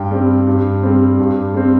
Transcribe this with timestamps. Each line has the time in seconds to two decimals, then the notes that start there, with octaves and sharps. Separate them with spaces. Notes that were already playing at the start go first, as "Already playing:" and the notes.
Already playing: G2 G5
0.11 G3 C4
0.47 G2
0.83 G3 C4
1.19 G2
1.54 G3 C4